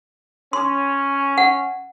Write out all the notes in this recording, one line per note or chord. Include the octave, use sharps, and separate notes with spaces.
C#4 C6
F#5